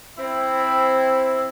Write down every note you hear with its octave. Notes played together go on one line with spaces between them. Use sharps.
C4 E4